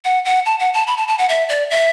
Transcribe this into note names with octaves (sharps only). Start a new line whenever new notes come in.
F#5
F#5
A5
F#5
A5
B5
A5
A5
F#5
E5
D5
E5